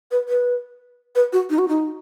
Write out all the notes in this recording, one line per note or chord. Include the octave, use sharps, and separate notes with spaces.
B4
B4
B4
F#4
D#4
F#4
D#4